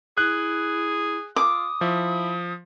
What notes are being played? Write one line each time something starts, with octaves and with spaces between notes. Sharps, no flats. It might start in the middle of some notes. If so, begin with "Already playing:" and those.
E4 G#4 F#6
F4 D6 D#6
F3 E4